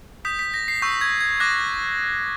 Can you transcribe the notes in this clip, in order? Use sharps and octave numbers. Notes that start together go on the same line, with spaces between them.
D#6 G6 B6
B6
A#6
C7
C#6 E6 G6
G#6
G#6
D6 F#6 A#6